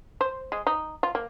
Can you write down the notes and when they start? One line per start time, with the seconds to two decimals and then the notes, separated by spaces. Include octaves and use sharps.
0.21 C5
0.52 G#3
0.67 D#4
1.03 F4
1.15 A#3